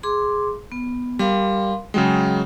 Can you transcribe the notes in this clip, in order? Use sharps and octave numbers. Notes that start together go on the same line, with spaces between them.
G#4 C6 D6
B3
G3 A#4 F5 C6
C#3 F#3 G#3 G5